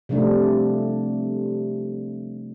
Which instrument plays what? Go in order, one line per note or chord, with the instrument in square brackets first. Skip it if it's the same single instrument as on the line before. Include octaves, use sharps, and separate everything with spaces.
[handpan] C3 F3 G3 A3 D4